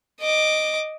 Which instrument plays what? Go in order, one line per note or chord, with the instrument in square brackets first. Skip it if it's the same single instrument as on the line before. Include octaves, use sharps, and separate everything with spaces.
[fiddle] D#5 D6